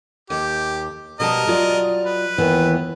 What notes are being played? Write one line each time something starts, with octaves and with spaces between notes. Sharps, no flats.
D#2 G4
B2 G3 A#4 D#5 A5
F#3 F4 D5
B4
D#2 E3 B3